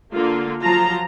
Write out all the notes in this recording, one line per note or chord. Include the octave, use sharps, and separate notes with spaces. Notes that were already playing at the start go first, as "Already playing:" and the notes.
D3 A#3 F4
F3 F#3 F4 A5 A#5